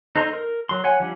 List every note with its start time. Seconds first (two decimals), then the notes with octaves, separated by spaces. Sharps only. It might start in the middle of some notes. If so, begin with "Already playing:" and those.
0.16 D#4 A4 C5 A#5 C6
0.34 A#4
0.69 F#3 C6
0.84 C#5 F#5 G#5
1.00 F3 G3 D4